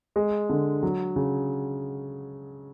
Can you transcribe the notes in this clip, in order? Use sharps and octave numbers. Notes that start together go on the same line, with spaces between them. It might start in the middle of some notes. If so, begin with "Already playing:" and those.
G#3
D3
F#3
C#3